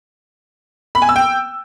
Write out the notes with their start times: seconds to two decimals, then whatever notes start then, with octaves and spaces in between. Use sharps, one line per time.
0.95 B5
1.02 G#5
1.09 E6
1.16 G5